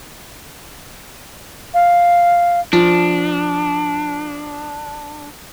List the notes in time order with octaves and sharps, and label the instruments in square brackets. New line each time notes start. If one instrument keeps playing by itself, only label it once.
[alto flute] F5
[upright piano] F3 [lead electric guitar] D4